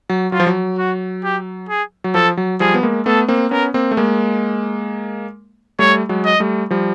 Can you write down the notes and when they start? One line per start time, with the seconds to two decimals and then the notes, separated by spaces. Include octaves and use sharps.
0.09 F#3
0.32 F#3 F4
0.40 F3
0.47 F#3
0.78 F#4
1.24 G4
1.69 G#4
2.04 F#3
2.14 F3 A4
2.37 F#3
2.60 F3 G3 G#4
2.74 B3
2.83 G#3 A#3
3.06 A3 B3 A4
3.28 A#3 C4
3.51 B3 C#4 A#4
3.74 A#3 C4
3.91 A3
3.97 G#3 A#3
5.79 G3 A3 C#5
6.09 F#3 G#3
6.25 D#5
6.40 G3 A3
6.70 F3 G3